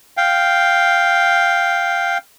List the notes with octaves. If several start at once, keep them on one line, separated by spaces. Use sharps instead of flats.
F5 G5